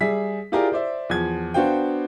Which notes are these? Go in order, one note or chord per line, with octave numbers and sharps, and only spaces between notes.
G3 G#4 E5 B6
E4 F4 G4 G#4 A#4 D5
C5 D5 E5
E2 F3 G#6
B3 D4 F#4 C5 F5 G5